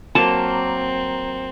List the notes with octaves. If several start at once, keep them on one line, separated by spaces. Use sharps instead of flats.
F#3 A#3 C4 A5